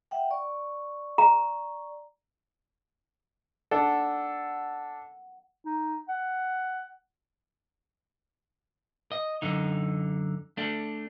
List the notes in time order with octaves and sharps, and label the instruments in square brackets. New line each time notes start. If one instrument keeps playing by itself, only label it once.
[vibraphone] E5 F#5 G5
D5 C#6
[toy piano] A#5
[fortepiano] D4 A4 [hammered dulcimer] F#5
[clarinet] D#4
F#5
[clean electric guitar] D#5
F#2 D3 D#4
A3 D4